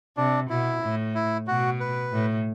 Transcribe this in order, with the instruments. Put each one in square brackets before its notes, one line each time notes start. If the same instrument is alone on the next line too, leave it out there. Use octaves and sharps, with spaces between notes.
[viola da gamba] C3 [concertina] D4
[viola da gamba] B2 [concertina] E4
[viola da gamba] A2
[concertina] E4
[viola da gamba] B2 [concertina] F#4
[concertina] B4
[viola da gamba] A2